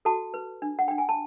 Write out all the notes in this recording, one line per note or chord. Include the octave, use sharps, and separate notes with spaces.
F#4 A4 A5
B4
D4
F#5
D4 G5
G#5
A5